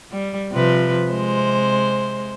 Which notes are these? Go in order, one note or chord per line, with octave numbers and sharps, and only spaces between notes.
G3
C3 F3 B4
C3 G#3 C5